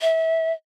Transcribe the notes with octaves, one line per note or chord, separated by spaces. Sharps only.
E5